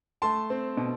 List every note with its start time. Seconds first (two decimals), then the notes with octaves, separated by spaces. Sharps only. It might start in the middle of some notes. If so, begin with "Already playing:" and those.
0.22 A3 A5 C6
0.50 C4
0.77 B2